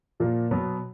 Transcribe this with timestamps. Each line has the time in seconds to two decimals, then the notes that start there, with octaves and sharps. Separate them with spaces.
0.20 A#2 F3 A#3
0.51 B2 F#3 B3